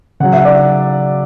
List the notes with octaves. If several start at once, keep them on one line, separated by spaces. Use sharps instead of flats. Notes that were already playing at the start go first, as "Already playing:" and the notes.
C#3 F#3 F#5
E5
D5 F#5